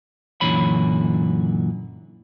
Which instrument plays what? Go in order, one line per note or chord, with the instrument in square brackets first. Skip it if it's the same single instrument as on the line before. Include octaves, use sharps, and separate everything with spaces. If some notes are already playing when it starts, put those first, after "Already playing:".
[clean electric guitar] F#2 A#2 D3 E3 C#5 B5